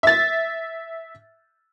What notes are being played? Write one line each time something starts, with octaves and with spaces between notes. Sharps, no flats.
E5 A6